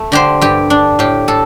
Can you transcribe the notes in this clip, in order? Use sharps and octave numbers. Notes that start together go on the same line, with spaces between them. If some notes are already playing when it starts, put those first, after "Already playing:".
Already playing: A3
D3 G4 C5
G2 G4
D4
A2 G4
A2 A4